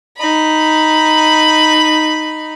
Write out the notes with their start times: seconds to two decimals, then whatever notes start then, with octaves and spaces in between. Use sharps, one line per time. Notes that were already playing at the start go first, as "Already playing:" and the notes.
0.17 D#4 B5